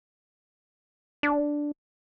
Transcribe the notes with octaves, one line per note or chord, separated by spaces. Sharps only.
D4